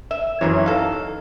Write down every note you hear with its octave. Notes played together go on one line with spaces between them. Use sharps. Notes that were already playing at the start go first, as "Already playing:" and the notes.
E5
F#2 C3 E3 D#4 C#5
D#4 A4 F5